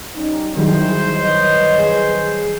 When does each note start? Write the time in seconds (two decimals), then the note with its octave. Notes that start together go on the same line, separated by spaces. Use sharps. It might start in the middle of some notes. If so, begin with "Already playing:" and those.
0.15 G3 C#4 D#4
0.57 D#3 F#3 G3 D#4 E4 G#4 C5
1.16 B4 C#5 D#5
1.78 G#4